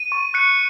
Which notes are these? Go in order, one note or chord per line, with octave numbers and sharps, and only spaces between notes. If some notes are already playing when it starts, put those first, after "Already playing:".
Already playing: D#7
C#6
F#6 C#7